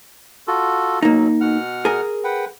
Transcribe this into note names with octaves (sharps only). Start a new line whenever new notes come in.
F4 F#4 A4
B2 F#3 A#3 D#4
B2 F#5 F6
G#4 A#4
B4 F#5 G5